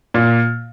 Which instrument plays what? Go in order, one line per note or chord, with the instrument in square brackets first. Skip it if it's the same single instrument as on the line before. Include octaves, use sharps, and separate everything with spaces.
[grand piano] A#2